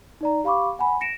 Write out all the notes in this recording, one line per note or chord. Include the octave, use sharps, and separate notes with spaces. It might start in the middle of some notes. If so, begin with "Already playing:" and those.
D#4 D5 A#5
G4 F5 B5 C#6 D6
F#5 G#5 B5
A#6 C#7 D7 E7